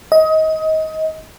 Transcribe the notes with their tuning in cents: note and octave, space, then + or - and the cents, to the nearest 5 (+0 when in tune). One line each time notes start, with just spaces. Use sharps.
D#5 +25